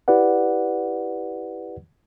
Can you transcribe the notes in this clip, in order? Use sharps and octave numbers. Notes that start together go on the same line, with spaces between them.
E4 G4 B4 D5 F#5